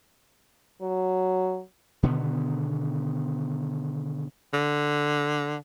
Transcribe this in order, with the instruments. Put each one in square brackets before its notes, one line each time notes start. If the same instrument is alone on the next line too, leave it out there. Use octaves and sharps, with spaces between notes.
[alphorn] F#3
[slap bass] B2 D3 D#3 B3
[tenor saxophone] D3